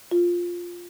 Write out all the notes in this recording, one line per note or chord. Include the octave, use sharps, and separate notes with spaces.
F4